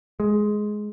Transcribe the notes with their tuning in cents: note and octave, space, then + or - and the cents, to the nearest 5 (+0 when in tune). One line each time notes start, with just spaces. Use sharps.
G#3 +10